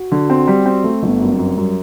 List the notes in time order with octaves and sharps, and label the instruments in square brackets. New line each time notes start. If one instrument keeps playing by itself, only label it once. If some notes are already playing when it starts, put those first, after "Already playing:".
Already playing: [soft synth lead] F#4
[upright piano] D3
C4
G3
C4
A3
G1
[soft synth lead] B3
[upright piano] F#2
[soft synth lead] C4
[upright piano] F#2
[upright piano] F#2 [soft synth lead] G3